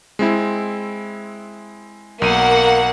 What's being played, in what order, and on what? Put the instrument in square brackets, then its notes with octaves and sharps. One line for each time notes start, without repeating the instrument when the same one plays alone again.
[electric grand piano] G#3 C4 E4
[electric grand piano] B1 D#7 [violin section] A#3 F#5